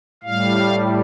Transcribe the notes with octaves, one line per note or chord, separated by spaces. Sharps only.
A2 G3 F5